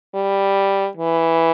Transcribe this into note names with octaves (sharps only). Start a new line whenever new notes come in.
G3
E3